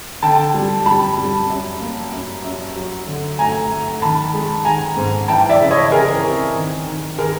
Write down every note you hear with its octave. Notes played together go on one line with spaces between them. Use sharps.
D3 G5 A5
G3
G3 A5 B5
G3
F#2
A#3
F#2
F#2
F#3
D3
A3 G#5 A#5
A3
D#3 A5 B5
G#3
D#3 G#5 A#5
G#2
E3 G5 A5
D5 E5
C#3
C#5 D#5
E3 G#4 A#4
C4
D#3
D#3
D#3 G#4 A#4